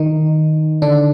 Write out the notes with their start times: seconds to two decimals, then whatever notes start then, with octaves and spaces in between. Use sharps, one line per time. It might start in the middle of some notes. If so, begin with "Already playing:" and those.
Already playing: D#3 D#4
0.82 D3 D4